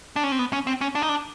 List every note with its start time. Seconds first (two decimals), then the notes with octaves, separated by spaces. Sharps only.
0.16 D4
0.23 C#4
0.32 C4
0.39 B3
0.53 C#4
0.67 C4
0.81 C#4
0.95 D4
1.02 D#4
1.09 D4